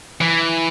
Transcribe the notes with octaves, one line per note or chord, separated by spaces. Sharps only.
E3